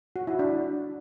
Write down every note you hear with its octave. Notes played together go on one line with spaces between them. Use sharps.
F#4
E4
D4